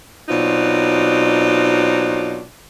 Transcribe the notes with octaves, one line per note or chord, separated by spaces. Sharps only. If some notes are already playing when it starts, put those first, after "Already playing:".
B2 F#3 C4 D4 D#4 F4